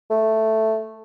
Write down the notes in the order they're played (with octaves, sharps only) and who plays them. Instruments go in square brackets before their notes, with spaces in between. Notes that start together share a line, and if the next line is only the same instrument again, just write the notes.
[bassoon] A3